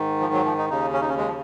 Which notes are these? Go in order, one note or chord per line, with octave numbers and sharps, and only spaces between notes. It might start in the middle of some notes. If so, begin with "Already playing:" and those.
Already playing: G#2 D#3
F3
F#3
F3
D#4
D#2 C#3 D#4
C#4
D#4
C#4
G#3
F3